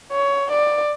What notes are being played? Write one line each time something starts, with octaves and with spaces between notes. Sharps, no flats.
C#5
D5